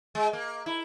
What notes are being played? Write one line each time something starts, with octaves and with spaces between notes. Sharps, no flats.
G#3
A#3
E4